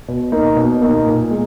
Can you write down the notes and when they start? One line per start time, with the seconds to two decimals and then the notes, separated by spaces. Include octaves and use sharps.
0.08 B2
0.32 A#3 D#4
0.57 B2
0.81 A#3 D#4
1.07 A#2
1.31 G#3